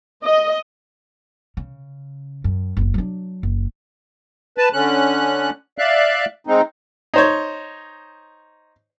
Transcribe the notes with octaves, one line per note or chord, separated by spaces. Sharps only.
D#5
C#3
F#2
F#1 A#3
F#3 D4
F#1
B4 A5
D3 C#4 F#6
D5 E5 F5 F#6
G#3 C4 D#4
D#4 C5 C#5